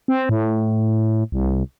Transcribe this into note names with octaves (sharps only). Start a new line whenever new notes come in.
C4
A2
C2